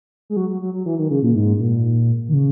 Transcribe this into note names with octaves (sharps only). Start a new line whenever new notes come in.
G#3
F#3
F#3
F#3
F#3
E3
D#3
C#3
A#2
G#2
A#2
D#3
C#3